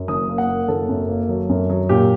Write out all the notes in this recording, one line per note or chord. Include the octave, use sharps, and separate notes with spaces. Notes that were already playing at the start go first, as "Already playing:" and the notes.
Already playing: F#2
F#1 D#6
A#3
F#5
A#3
F#1 A4
F#2
A#3
F#3
F#2
F#3
A#2 G4